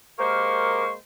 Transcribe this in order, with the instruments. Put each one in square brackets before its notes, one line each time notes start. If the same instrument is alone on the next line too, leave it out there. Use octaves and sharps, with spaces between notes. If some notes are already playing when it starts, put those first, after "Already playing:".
[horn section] G#3 A#3 C5 [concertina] G4 A#4 [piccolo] C#6